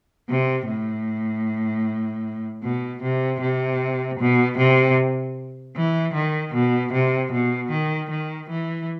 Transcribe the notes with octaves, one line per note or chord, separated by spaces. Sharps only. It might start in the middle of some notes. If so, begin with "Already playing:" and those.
C3
A2
B2
C3
C3
B2
C3
E3
D#3
B2
C3
B2
D#3
D#3
E3